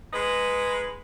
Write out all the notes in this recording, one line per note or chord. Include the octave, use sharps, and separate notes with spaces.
G#3 D#4 B4